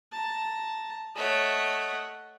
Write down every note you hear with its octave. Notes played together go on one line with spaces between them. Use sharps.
A5 A#5
A3 C#5 D#5 F#5